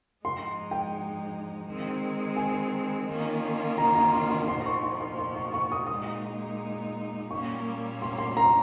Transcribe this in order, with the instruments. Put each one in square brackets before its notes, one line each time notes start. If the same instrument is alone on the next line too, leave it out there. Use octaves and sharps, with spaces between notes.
[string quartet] G#2 F3 G#3 D#4 [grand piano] C6
[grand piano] G5
[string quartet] D#3 G#3 C4
[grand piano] G#5
[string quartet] D#3 A#3 C#4 F4
[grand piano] A#5
A#5
C6
C6
[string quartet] A#2 F3 A#3 D#4 [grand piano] C6
[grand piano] C#6
C6
C6
C6
C#6
C#6
D#6
[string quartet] A#2 G#3 D#4 [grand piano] D#6
[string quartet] A#2 G3 A#3 C#4 [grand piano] C#6
[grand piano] C6
C6
A#5